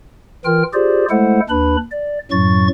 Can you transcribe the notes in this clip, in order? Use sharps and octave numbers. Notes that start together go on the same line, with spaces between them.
E3 F4 A#4 G5 F6
F4 G4 G#4 C5 D5
G#3 A3 E4 A4 C5 F#5
D#2 D4 B4 B5
D5
F#2 A2 F#3 C#6 A6